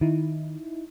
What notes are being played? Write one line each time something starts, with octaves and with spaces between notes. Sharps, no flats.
D#3 D#4 E4